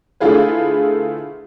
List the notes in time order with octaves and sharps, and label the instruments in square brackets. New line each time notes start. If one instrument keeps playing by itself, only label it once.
[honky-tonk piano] D3 A3 E4 F4 G#4 B4